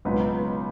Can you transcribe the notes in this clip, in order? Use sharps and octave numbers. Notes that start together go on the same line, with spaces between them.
C#2 B2 F#3 D#4 B4